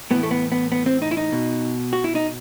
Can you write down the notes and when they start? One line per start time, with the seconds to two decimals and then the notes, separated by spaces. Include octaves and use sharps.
0.11 A2 E3 B3
0.23 A3
0.31 B3
0.52 B3
0.72 B3
0.86 C4
1.02 D#4
1.11 E4
1.17 D#4
1.32 B2
1.93 F#4
2.04 E4
2.15 D#4